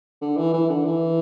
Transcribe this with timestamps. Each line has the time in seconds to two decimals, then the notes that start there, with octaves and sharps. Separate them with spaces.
0.22 D3
0.37 E3
0.53 E3
0.70 D3
0.85 E3